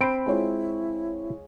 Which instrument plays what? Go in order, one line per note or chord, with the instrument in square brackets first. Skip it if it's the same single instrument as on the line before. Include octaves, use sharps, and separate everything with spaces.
[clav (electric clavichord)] C4 C5 [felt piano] B5 D7
[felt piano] G#3 F4 C#5 [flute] E4